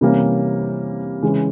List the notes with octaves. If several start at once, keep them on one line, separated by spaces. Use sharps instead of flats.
C3 E3 G3 A#3 C#4
C#3 E3 G#3